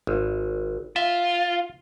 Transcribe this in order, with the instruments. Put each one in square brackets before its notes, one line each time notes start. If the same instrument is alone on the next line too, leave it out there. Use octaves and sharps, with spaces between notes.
[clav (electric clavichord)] G#1
[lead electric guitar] F4 [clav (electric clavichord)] E5